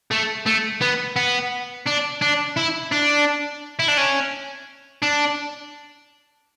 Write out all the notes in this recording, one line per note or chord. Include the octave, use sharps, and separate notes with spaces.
A3
A3
B3
B3
D4
D4
E4
D4
E4
D4
C#4
D4